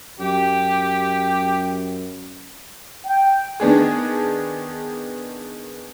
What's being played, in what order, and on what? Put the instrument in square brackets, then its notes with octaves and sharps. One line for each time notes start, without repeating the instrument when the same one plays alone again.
[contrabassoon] F#2 [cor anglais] G4
[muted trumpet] G5
[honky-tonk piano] D#3 B3 D4 G#4